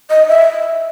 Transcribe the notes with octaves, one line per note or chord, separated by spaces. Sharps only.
D#5
E5